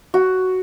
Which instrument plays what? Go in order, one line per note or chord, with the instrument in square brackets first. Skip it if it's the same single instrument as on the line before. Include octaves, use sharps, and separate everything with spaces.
[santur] F#4